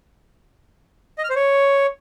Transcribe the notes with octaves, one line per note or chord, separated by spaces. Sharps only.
D#5
F6
C5
C#5